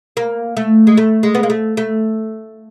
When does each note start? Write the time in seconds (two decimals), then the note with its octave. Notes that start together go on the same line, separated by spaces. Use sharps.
0.17 A#3
0.57 A3
0.87 G#3
0.97 A3
1.23 G#3
1.35 B3
1.43 A#3
1.50 A3
1.77 A3